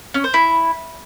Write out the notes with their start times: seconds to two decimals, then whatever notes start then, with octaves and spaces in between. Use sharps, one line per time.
0.14 C#4
0.24 C5
0.34 E4